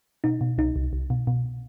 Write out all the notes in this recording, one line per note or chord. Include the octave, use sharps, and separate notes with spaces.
B2 D#4
B2
C2 D#4
C2
C2
B2
B2